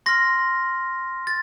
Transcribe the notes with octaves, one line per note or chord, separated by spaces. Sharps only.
C6 F6 A#6
A6